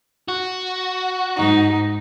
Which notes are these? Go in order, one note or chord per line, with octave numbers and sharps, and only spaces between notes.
F#4
G#2 D#4